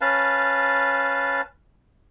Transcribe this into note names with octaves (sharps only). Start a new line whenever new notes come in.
C#4 B4 F5 A5